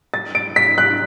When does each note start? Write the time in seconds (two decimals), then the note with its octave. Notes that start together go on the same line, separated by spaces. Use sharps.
0.14 A6
0.35 D7
0.56 B6
0.78 F#6